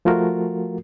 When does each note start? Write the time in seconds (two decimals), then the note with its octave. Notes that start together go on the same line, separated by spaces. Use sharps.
0.05 F3 A3 F4 F#4 A#4